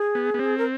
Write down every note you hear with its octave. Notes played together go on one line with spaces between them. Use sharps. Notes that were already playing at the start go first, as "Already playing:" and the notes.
Already playing: G#4
B3
B3
C4
A#4